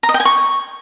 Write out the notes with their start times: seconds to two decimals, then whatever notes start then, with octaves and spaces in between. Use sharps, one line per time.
0.03 A#5
0.09 D#5
0.14 G5
0.20 G#5
0.25 C#6